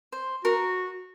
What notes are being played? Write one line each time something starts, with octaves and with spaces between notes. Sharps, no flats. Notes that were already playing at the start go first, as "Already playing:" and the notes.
C5
F#4 A#4